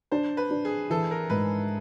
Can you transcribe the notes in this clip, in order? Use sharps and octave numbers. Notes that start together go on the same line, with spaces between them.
D4 C5
B4
D4
G#4
E3 A4
A#4
G#2 B4